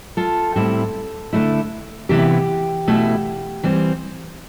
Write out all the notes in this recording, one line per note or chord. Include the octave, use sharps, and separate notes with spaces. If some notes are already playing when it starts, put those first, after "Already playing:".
F4 A4
A2 G3 C4 E4
D3 A3 E4
C3 E3 B3 E4 G4
B2 A3 E4
E3 G3 C4